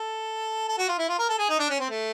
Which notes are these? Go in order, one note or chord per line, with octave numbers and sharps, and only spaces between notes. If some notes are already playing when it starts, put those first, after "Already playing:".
Already playing: A4
A4
F#4
F4
E4
F4
A#4
A4
G#4
D#4
D4
C#4
C4
A3